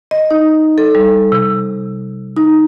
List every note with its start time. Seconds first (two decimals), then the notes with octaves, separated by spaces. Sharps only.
0.11 D#5
0.31 D#4
0.78 A4
0.95 G3
1.32 C3
2.37 D#4